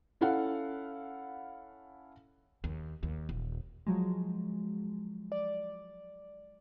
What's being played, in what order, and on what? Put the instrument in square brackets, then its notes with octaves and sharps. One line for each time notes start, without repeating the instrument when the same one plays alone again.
[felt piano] C#4 E4 A4 F5 F#5
[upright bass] D#2
D#2
D#1
[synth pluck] F3 F#3 G#3
D5